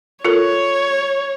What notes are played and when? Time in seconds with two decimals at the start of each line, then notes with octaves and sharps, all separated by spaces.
0.25 F4 A4 A#4 C#5